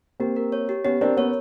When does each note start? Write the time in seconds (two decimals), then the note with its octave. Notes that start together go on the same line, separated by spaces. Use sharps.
0.20 A#3 C4 G4
0.36 A#4
0.52 C#5
0.69 G4
0.84 B3 C#4 G4
1.01 C4 D4 A#4
1.17 B3 C#4 C#5